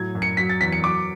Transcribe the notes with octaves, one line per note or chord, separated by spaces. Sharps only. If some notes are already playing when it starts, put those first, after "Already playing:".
Already playing: A2 F#3 G#6
F#2
C#7
F#3 B6
A6
E2 B6
C#7
F#3 D6